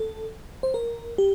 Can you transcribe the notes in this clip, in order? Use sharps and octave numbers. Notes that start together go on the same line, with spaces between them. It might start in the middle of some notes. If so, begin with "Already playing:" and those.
Already playing: A4
C5
A#4
G4